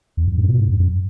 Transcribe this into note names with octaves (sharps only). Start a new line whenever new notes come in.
E2
F#2
G#2
B2
G#2
F#2
F#2